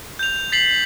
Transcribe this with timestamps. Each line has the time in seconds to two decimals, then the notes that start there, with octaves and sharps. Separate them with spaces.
0.19 G6 F7
0.52 A6 B6 C7 F#7